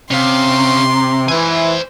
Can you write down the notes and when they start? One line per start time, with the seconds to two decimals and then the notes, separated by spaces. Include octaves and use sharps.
0.11 C3 C#4 F5 C6
1.28 E3 C5 G#5